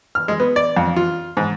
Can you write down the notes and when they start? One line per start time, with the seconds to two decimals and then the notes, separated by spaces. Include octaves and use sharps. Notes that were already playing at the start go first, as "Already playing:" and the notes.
0.15 F6
0.28 G#3
0.40 B3
0.56 D5
0.77 F2
0.96 F4
1.37 G#2